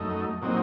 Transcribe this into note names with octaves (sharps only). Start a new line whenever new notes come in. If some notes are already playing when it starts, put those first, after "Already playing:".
Already playing: F#2 A3 D#4
A#2 F#3 C4 D#4